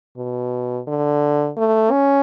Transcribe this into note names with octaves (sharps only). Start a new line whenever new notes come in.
B2
D3
A3
C#4